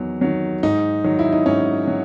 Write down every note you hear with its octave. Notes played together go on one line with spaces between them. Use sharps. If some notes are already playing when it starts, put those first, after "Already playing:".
Already playing: E2 D#3 F#3
D#3 F#3
G#2 D#4
D#3 F#3
E4
D#4
G#2 C#4
F#3